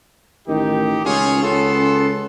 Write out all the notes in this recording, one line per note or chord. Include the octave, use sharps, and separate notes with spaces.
A1 D#3 D#4 G4
C#2 C#4 F4 G#4 C#5
C#2 B3 A4 C6